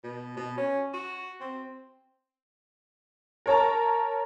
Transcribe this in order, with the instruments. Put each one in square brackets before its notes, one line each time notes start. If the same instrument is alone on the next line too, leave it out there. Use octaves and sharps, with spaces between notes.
[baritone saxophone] B2
B2
C#4
F#4
C4
[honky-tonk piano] A#4 C#5 A5 A#5